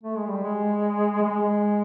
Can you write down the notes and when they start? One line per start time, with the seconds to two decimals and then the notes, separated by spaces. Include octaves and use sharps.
0.03 A3
0.17 G#3
0.30 G3
0.43 G#3
1.22 G#3